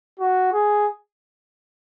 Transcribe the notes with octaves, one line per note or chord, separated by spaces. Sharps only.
F#4
G#4